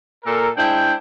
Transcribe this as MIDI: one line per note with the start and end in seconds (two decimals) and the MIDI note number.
0.25 0.49 46
0.25 0.49 69
0.25 0.49 70
0.57 0.93 56
0.57 0.93 62
0.57 0.93 64
0.57 0.93 72
0.57 0.93 79